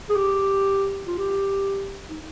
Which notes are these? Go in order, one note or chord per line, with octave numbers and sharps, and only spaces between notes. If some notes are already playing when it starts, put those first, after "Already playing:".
G#4
G4
F4
G4
D#4